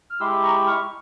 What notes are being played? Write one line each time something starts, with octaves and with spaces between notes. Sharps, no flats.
F6
G#3 E4 G4 C6 E6
A#5 C#6
C#6 F6